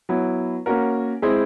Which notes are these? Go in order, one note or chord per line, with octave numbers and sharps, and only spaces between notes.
F#3 B3 E4
A#3 C#4 F#4 A#4
G#3 C4 E4 G#4 C5